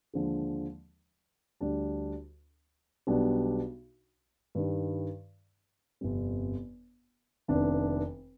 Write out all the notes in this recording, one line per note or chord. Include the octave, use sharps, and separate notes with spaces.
D#2 D3 F3 G#3
D2 D3 G3 D4
B1 B2 G3 D4
G2 D#3 G3
G1 F2 C3 G3
F1 F2 D#3 B3 D4